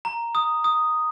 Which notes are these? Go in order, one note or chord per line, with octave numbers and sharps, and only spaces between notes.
A#5
D#6
D#6